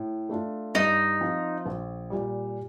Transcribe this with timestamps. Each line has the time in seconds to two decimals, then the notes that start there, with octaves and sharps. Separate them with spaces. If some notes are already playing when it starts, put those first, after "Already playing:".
Already playing: A2
0.29 A3 D4 F4
0.75 G2 D#4
1.20 F3 C4 F4
1.66 A#1
2.10 A#2 G3